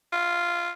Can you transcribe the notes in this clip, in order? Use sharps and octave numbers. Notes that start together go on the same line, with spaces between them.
F4